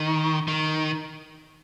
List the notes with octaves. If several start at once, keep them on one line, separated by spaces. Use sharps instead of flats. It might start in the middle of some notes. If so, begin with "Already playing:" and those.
Already playing: D#3
D#3